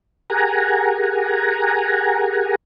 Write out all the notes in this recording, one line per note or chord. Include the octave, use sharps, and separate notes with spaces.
G4 G#4 A#4 F#5 G#5 A#5